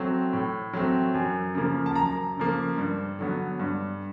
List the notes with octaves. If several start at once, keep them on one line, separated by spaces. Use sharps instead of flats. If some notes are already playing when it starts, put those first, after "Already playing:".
Already playing: F#3 A3 C4
A2
F#3 A3 C4
F#2
C#3 F3 A#3
A5
F#2 A#5
C#3 F3 A#3
G2
D3 F#3 B3
G2